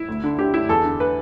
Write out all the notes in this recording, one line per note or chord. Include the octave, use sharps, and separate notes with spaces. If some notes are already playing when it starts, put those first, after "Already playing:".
Already playing: E4
D2
D3
D3 G4
D3 E4
E2 A4
D3
B4